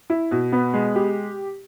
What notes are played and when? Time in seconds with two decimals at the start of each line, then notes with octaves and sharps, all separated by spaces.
0.10 E4
0.31 B2
0.52 B3
0.73 G#3
0.95 G4